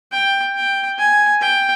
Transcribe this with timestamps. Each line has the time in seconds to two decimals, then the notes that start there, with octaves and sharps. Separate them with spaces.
0.12 G5
0.56 G5
0.98 G#5
1.41 G5